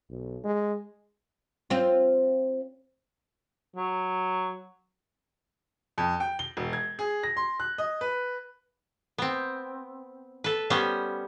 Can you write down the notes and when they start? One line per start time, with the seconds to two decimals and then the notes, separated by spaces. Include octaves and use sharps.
0.10 B1
0.44 G#3
1.70 C4 F4
3.76 F#3
5.98 F2
6.20 G5
6.39 G7
6.57 E1
6.73 G#6
6.99 G#4
7.23 A#6
7.37 C6
7.60 F#6
7.78 D#5
8.01 B4
9.18 B3 C4
10.44 A4 B4
10.70 G3 B3 C#4 C5